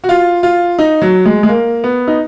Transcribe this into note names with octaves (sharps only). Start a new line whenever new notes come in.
F#4
F4
F4
D#4
F#3
G#3
G#3
A#3
B3
D#4